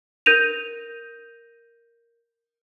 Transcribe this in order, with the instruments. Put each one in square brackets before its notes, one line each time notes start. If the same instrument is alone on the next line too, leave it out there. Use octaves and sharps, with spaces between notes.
[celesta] A#4 G6 A#6 D#7 F7